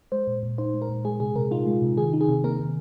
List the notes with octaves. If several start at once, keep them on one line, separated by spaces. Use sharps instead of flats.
G#3 C5
A#2
A#2
D#4 C5
G#3
A#4
A#2
G#3 G#4
C3 G#4
C3 A#4
D#4 F4
G#3
C3
D#3 G#4
D#4
G#4
C3
A#3 A#4
D#3